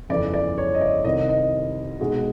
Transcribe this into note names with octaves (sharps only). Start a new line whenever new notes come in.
G1 F2 C#3 E3 D5
D5
C#5
D#5
D5
C2 C3 D#3 D#5
D#5
B1 B2 G#3